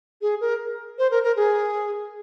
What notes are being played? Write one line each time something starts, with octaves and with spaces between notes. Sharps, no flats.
G#4
A#4
C5
A#4
A#4
G#4